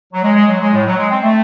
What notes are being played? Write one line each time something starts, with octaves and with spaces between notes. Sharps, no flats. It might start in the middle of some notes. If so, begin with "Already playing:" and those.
F#3
G#3
G#3
F#3
G#3
A2
F#3
G#3
C4
A3